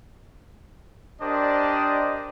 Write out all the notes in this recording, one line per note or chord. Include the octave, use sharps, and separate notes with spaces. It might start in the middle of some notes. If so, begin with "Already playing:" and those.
D4 G4 A#4 C5 D5 D#5